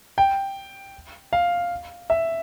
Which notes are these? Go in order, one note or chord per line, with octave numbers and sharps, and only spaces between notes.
G5
F5
E5